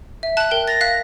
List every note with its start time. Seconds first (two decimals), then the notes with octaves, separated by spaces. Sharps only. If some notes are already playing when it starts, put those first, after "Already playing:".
0.23 E5
0.37 A5 F#6
0.51 A#4 G5
0.68 A6 A#6
0.81 F5 F#6 B6